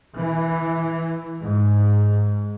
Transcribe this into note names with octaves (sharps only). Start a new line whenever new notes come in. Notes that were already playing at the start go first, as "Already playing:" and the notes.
E3
G#2